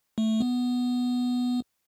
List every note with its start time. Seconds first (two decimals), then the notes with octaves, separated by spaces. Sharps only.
0.18 A3
0.40 B3